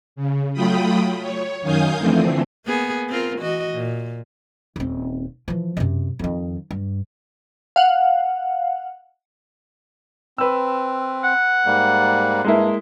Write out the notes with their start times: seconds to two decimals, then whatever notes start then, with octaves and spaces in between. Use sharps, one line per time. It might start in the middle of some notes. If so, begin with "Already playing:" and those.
0.16 C#3
0.53 F#3 A3 F4 G5 B5 D#6
1.22 C#5
1.61 F#2 D#3 F5 G#5 D#6 G6
1.99 D3 E3 F3 A3 C4
2.65 A#3 B3 G#4
3.09 C4 F4 A#4
3.39 E3 F#4 D#5
3.72 A#2
4.76 D#1 C4
5.48 E3 F3
5.77 F#2 C3
6.19 F2 D#3
6.71 G2
7.76 F5 F#5
10.38 C4 B4 E6
11.24 F#5
11.66 G#2 G3 A#3
12.44 G2 G#3 A#3 E4